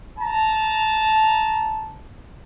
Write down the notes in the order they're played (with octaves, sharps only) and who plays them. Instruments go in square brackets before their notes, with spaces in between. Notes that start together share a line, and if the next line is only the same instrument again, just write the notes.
[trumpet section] A5 A#5